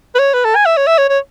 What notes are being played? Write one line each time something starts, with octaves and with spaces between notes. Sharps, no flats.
B4
C#5
B4
A4
G#5
E5
C#5
E5
C#5
C#5